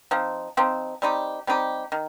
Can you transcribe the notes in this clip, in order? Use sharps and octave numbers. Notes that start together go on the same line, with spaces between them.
F3 C4 D#4
F3 C4 D#4
G3 C4 D#4 G4
G3 C4 D#4 G4
D#3